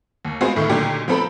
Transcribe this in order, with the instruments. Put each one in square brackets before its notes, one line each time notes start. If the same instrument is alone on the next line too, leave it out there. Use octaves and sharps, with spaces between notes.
[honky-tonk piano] D#2
G#3 B3 C4 F4 F#4 G#4
D2 A2 D#3 A3
A#2 D3 D#3 F#3 D4 G4
F3 B3 C4 A4 A#5 B5